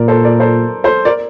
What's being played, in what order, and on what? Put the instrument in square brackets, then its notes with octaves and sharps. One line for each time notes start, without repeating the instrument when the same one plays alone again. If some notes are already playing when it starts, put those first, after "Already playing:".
Already playing: [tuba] A#2 [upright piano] A#4 D5
[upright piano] A4 C5
A#4 D5
A4 C5
A4 C5
A#4 D5